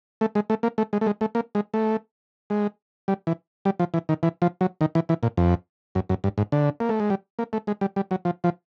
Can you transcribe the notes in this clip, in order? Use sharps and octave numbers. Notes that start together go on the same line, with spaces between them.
A3
G#3
A3
A#3
A3
G#3
A3
G#3
A3
A#3
G#3
A3
G#3
G3
E3
G3
F3
E3
D#3
E3
F3
F#3
D#3
E3
E3
A#2
F2
F#2
F#2
G2
G#2
D3
A#3
A3
G#3
G3
A#3
A3
G#3
G3
G3
F#3
F3
F3